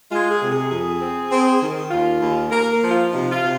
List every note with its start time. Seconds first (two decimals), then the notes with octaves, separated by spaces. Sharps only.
0.11 G#3 F4
0.31 G#4
0.41 C3
0.52 G#4
0.71 F2 G#4
1.01 C4
1.31 C4
1.61 D#3
1.91 D#2 F4
2.21 D#2
2.51 A#3 A#4
2.72 A#4
2.82 F3
2.91 F4
3.12 C3 D#4
3.32 F4
3.42 C3